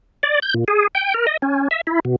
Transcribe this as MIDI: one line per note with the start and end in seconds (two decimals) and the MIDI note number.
0.23 0.40 74
0.42 0.54 91
0.54 0.64 46
0.68 0.87 68
0.95 1.14 79
1.14 1.26 70
1.27 1.37 75
1.42 1.68 61
1.71 1.81 76
1.87 2.00 64
2.05 2.16 47